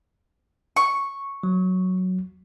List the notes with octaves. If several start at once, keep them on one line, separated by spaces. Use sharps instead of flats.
C#6
F#3